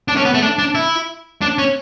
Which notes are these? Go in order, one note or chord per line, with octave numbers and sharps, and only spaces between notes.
D4
C#4
B3
A3
D4
D4
E4
D4
C#4